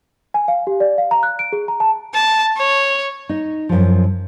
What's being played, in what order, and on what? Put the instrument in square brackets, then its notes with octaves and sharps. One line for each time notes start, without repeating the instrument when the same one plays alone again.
[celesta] G#5
F5
G4
D5
F5
A#5
F#6
D7
G#4
A#5
A5
[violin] A5
C#5
[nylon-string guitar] D#4
F#2 F3